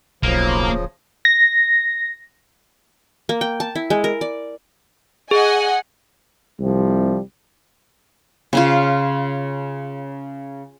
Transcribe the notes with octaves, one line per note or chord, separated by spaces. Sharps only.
D1 B1 C#3 F3 A#3
A#6
A#3
G5
A5
E4
G#3
A#4
D5
G#4 D#5 F#5 G#5
C2 C3 F3 G3
C#3 C#4 F4